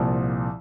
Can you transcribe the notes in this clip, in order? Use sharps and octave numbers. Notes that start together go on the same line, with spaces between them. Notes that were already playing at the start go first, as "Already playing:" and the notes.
Already playing: C2 A#2 F3